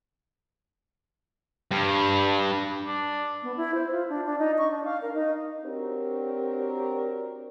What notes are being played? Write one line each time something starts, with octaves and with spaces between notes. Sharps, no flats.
G2
D4
B3
E4
C5
F4
D4
D4
D#4
C#6
D4
F5
A#4
D#4
C4 D4 F#4 G4 A#4 C#5